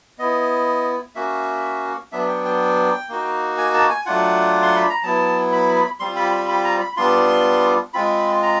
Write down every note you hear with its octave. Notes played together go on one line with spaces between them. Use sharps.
B3 E4 D#5
A#3 C#4 F#4 E5
F#3 B3 D4 E5
G5
G5
A#3 D#4 F#4
G#5
A5
G#5
F#3 A3 D4 F4 F#5
C6
B5
A#5
F#3 B3 E4 A5
B5
G3 C4 F4 C6
B5
B5
B5
A#5
B5
G3 B3 D4 F4 C6
G#3 C4 F4 B5
A#5